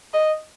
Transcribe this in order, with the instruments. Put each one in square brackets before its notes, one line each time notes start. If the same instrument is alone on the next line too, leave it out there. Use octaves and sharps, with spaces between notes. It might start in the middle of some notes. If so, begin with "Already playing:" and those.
[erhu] D#5